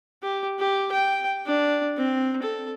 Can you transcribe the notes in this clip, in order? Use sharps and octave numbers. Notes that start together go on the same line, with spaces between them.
G4
G4
G5
D4
C4
A4